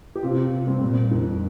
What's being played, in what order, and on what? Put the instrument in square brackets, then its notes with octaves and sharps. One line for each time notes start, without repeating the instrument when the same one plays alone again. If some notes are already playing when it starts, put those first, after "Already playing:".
[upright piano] G4
[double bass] C3 [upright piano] C4 F4
[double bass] C3
[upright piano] G3 C4
[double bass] A#2 [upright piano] G3 C4
[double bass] F2 [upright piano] D#3 G3